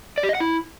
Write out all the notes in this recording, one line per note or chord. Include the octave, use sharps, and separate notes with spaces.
D5
G4
D#5
F#5
E4